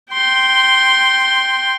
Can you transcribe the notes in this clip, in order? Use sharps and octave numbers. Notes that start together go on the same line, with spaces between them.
G5 C6